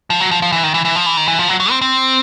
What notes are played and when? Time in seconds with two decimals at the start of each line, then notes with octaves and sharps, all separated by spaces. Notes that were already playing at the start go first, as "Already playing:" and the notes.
0.10 F3
0.20 F#3
0.31 F3
0.42 F3
0.52 E3
0.63 D#3
0.74 E3
0.85 E3
0.95 F3
1.06 E3
1.17 D#3
1.28 E3
1.39 F3
1.49 F#3
1.60 F#3
1.70 C4
1.81 C4